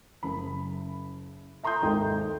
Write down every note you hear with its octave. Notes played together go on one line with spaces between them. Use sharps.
F#1 C#3 B5
E5 A#5 C6 D#6 G6
G#1 D#2 G#3 D#4 A4 G5